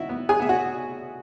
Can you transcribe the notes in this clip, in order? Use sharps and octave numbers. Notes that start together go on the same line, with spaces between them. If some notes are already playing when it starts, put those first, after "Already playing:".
Already playing: D#3 E4 F#4 E5
B3
G#4 G#5
B3 E5
F#4 F#5